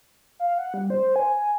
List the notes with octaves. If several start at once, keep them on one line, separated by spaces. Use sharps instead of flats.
F5
F#5
G3
C5
G#5
G#5